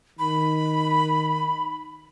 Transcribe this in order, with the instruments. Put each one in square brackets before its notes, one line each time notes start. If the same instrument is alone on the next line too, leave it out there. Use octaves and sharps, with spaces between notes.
[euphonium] D#3 [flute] B5